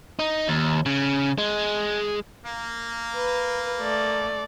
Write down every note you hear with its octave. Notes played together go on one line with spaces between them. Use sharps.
D#4
D#2
C#3
G#3
A#3
B4
A3 D5